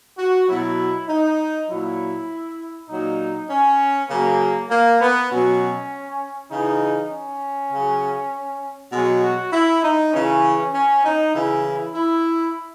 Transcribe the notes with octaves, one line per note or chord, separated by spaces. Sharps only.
F#4
B2 F#3 E4
D#4
A#2 F#3 E4
A#2 F#3 D#4
C#4
C#3 F#3 A#3
A#3
B3
B2 F#3 C#4
C#3 E3 D#4
C#4
C#3 F#3
B2 F#3 G#3
F#4
E4
D#4
C#3 E3 C#4
C#4
D#4
C#3 E3 E4
E4